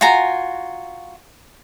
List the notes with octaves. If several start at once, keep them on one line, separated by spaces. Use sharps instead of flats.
F4 F#4 G#5 A#5